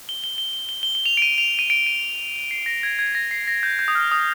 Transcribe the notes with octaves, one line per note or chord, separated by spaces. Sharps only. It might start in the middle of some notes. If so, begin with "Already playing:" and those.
G7
G7
G7
G7
G7
G7
G7
F7
D7
D#7
F7
D#7
D7
D#7
C7
A#6
G#6
G#6
A#6
C7
A#6
G6
G6
D#6
F6
D#6